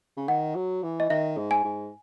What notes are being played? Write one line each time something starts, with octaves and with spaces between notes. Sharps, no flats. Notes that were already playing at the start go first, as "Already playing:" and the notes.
C#3
D#3 F#5
F#3
E3
D#5
D#3 E5
G#2
G#5
G#2